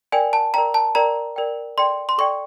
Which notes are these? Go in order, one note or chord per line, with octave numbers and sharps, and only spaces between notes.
A#4 D5 G5 G#5
A5
A#4 D5 G5 A#5
A5
A#4 D5 G5 A#5
A#4 D5 G5
A4 D5 G5 C6
C6
A4 D5 G5 C#6